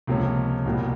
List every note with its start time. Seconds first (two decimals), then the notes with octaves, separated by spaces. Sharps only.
0.07 C#2 C3 F3 A#3 C#4
0.65 C2 B2 G3 A#3